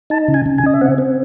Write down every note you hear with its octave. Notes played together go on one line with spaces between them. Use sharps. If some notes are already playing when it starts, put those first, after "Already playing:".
D#4 A5
C#3
G#5
C#3
G#5
C#3 D#5
E5
C4 F#5
C4